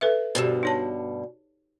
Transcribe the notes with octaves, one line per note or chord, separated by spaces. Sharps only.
A4 B4 E5
D2 G2 B2 G4 C5
D#4 C#5 A5